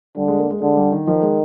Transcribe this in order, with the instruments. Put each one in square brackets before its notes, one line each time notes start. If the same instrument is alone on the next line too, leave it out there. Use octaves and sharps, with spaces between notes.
[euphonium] D3 [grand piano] G3
[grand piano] G#3
A#3
G#3
[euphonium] D3 [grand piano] G#3
[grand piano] G3
D#3
[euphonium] D#3 [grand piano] F3
[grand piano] G#3